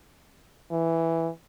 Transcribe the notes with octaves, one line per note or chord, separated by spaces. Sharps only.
E3